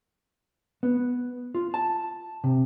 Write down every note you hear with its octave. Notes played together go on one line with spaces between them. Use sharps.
B3
F4
A5
C3